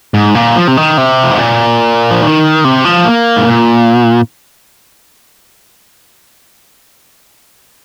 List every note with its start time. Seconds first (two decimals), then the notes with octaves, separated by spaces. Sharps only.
0.14 G#2
0.35 A#2
0.56 F3
0.68 C3
0.77 D#3
0.98 C3
1.23 F2
1.31 G#2
1.39 A#2
2.11 F3
2.22 D#3
2.64 C3
2.85 F3
3.05 A#3
3.37 G#2
3.47 A#2